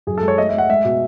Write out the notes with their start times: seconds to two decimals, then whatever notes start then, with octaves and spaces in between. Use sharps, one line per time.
0.07 F#2 G#4
0.18 A4
0.23 G#3
0.28 C#5
0.38 A3 D#5
0.49 E5
0.54 A3 F#5
0.69 G#3 E5
0.84 B2